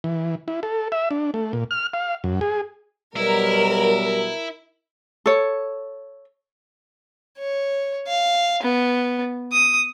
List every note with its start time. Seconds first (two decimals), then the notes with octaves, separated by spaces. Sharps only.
0.04 E3
0.48 E4
0.63 A4
0.92 E5
1.11 D4
1.34 A3
1.53 A#2
1.71 F6
1.94 F5
2.24 F#2
2.41 G#4
3.16 B2 F#3 G3 E4 A#4
5.26 A4 C#5
7.39 C#5
8.07 F5
8.63 B3
9.52 D#6